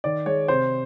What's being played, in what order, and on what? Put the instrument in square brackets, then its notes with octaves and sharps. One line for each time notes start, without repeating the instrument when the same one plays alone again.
[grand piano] D#3 D5
G#3 C#5
C3 C5